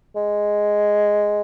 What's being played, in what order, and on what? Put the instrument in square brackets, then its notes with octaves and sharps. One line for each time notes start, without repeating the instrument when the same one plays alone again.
[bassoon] G#3